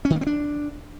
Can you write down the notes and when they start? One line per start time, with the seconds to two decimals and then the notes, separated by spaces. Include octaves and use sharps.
0.05 C#4
0.10 D#3
0.16 A#3
0.21 C4
0.27 D4